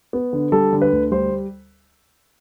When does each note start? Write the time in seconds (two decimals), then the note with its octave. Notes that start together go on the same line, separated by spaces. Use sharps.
0.13 B3
0.33 D3
0.52 G3 A4
0.73 D3
0.82 B4
0.92 D2
1.11 G3 C5